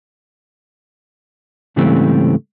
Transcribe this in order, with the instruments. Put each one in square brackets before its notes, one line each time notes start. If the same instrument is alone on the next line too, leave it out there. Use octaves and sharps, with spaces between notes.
[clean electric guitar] G#2 C#3 E3 G3 A3 C4